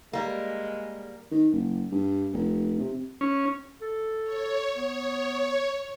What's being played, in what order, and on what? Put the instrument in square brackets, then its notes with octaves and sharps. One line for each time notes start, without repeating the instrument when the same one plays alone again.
[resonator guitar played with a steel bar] G3 A#3 [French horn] G#3
[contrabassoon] D#3
F#1
G2
F1
C3
[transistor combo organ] C#4
[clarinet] A4
[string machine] C#5
[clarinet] B3 [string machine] C#5